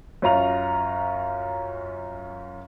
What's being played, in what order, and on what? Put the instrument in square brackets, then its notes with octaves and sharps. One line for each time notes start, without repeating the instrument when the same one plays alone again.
[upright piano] F#2 C#4 F4 A#5 F7